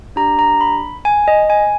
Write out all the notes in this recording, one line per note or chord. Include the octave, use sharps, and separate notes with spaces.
D4 G4 A#5
A#5
B5
G#5
D#5
G#5